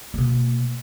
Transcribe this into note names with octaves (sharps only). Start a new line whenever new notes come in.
B2 A#3